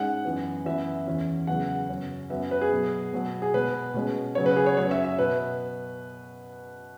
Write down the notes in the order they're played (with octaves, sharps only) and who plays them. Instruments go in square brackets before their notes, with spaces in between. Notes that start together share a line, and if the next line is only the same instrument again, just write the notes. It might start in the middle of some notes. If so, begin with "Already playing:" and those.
Already playing: [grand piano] G#2 G#3 C#4 F#5
F#2 E3 B3
F#2 E3 B3 E5
E2 E3 C#4
E2 C#3 F#3 B3 F#5
F#2 C#3 F#3 C#4
F#2 F#3 B3 E5
B4
G#4
B2 F#3 B3
B2 F#3 B3
G#4
B2 G#3 B3 B4
B2 G#3 C#4
C#3 F#3 B3 C#5
B4
G#4
C#5
F#2 F#3 C#4 C#5
E5
E5
B2 B3 B4